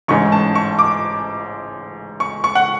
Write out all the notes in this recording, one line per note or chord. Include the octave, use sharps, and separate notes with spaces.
A1 G#2 G#3 C#4 C#6
A5
C#6
D6
C#6
C#6
F#5